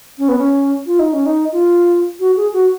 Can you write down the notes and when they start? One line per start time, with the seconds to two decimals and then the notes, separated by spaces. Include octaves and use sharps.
0.18 C#4
0.29 B3
0.38 C#4
0.86 F4
0.99 D#4
1.13 C#4
1.26 D#4
1.52 F4
2.20 F#4
2.36 G#4
2.53 F#4